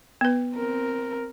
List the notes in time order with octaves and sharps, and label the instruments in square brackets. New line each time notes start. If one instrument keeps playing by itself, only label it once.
[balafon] B3 B4
[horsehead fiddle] C4 A#4